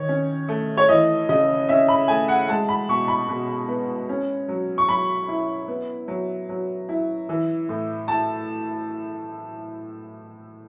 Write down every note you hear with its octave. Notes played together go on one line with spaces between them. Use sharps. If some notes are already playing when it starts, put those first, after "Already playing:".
Already playing: D#3 C#5
C#4
A3
C#5
E3 D#5
C#3 D#5
C#4 E5
B5
A3 G#5
F#5
G#3 A5
B5
B2 C#6
B5
B2
B3
C#4
F#3
C#6
F#3 B5
E4
B3
F#3
F#3
E4
E3
A2
E4 A5